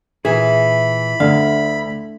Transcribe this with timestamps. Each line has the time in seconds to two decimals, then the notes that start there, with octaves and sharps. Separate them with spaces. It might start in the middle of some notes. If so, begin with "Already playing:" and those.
0.25 A#2 E3 G#4 B5
1.20 D2 D3 F5